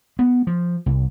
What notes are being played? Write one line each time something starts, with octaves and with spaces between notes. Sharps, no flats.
B3
F3
C2